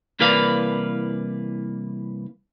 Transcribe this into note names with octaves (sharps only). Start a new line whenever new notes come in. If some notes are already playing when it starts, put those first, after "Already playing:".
C2 E3 A#3 B4 D5 F5